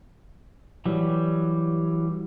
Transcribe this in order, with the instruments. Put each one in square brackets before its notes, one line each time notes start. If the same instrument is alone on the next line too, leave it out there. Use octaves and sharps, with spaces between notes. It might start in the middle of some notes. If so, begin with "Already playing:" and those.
[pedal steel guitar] E3 F#3 G3